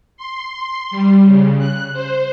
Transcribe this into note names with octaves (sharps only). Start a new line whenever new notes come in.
C6
G3
C#3
F#6
C5